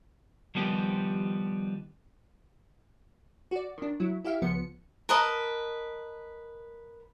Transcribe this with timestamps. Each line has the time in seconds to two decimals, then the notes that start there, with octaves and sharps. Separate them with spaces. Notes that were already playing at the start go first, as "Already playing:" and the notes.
0.55 D#3 F3 G3 B3 G4
3.51 F#4 D5
3.78 D#3 D4
4.00 F#3 E4
4.24 E4 G4 E5 F5
4.42 C#2 F3 B3 C#7
5.09 A#4 B4 D#5 A5